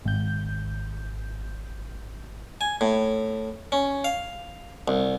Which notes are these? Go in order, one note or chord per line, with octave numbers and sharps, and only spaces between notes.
G#1 G6
G#5
A2
C#4
F5
C2